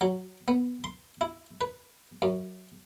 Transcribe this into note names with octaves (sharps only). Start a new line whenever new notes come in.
F#3
B3
C6
E4
B4
F#2